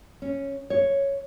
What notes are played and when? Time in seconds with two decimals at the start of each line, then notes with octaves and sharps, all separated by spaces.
0.22 C#4
0.70 C#5